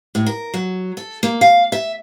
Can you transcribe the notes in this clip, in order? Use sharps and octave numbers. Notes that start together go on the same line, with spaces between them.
A2
A#4
F#3
A4
A#3
F5
E5